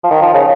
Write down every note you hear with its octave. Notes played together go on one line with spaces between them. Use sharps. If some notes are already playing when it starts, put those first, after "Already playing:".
F3
D#3
F3
C#3